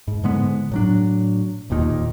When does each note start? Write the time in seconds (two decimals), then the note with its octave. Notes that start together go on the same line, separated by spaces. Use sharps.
0.08 G#2
0.24 G#2 D3 G#3 B3
0.71 A2 F#3 D4
1.70 E1 D#2 A#2 D#3